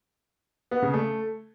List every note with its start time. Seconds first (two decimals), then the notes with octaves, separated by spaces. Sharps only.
0.71 B3
0.82 C#3
0.93 A3